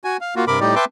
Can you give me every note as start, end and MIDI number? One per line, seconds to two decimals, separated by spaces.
0.04 0.17 66
0.04 0.17 80
0.21 0.35 77
0.36 0.45 58
0.36 0.45 65
0.36 0.45 66
0.47 0.60 43
0.47 0.60 48
0.47 0.60 70
0.47 0.60 83
0.47 0.60 86
0.60 0.75 45
0.60 0.75 55
0.60 0.75 63
0.60 0.75 67
0.60 0.75 74
0.76 0.85 71
0.76 0.85 76
0.76 0.85 79
0.76 0.85 81
0.76 0.85 84
0.76 0.85 86